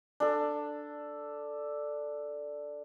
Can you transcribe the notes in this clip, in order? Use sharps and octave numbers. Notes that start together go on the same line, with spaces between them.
D4 A4